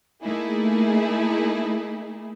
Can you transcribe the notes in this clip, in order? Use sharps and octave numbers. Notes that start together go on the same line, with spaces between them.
A3 A#3 D#4 E4 G#4